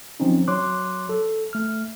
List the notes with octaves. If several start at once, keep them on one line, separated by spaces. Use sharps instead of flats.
F3 F#3 C4 C#4 D#4
F#3 C#5 C6 D6 F#6
A4
A3 F6